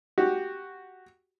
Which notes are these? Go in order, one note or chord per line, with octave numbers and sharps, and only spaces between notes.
F#4 G4